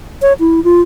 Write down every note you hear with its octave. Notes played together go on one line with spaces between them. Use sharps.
C#5
E4
F4